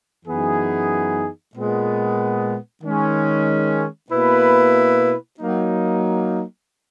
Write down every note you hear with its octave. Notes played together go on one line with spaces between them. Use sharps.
F#2 E3 B3 D#4 G#4
A#2 G#3 B3
D#3 G#3 C#4
B2 A#3 E4 B4
F#3 A#3 D#4